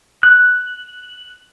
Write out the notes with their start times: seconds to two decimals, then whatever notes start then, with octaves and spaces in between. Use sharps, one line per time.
0.23 F#6